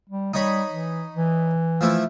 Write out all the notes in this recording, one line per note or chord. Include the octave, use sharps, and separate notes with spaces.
G3
G3 D#4 C#5 B5
E3
E3
F3 A3 E4